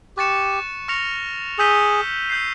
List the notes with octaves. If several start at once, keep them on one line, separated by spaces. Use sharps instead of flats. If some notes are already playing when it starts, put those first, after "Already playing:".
G4 C#6 F#6 A6 C#7 E7
C#6 F6 A#6 C#7 F7
G#4 E6 G6 B6 D#7 G7
E6 G6 C7